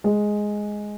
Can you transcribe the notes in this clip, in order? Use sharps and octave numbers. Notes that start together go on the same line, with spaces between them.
G#3